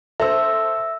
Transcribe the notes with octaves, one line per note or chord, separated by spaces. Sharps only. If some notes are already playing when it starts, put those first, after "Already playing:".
A4 C5 E5 E6